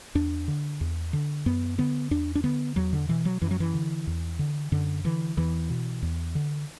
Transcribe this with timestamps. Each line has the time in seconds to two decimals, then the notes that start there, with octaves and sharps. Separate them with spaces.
0.15 E2 D4
0.48 D3
0.81 E2
1.13 D3
1.46 F#2 B3
1.78 D3 B3
2.11 E2 D4
2.35 D4
2.44 D3 B3
2.76 E2 F#3
2.93 D3
3.08 B2 E3
3.25 F#3
3.42 F#2 E3
3.51 F#3
3.60 E3
3.74 D3
4.07 E2
4.39 D3
4.72 F#2 D3
5.04 D3 E3
5.37 E2 E3
5.70 B2
6.02 E2
6.35 D3